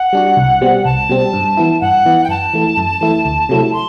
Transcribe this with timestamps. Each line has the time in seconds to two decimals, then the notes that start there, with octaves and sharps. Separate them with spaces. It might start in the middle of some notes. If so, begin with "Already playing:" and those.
Already playing: F#5
0.13 G3 D4 F#4
0.37 C2
0.61 B2 G3 C4
0.85 C2 A5
1.09 B2 G3 C4
1.33 G2
1.57 E3 B3 E4
1.81 G2 F#5
2.05 E3 B3 E4
2.24 G5
2.29 F#2 A5
2.54 E3 A3 E4
2.77 F#2
3.01 E3 A3 E4
3.25 D2
3.49 C3 F#3 A3 E4
3.73 C6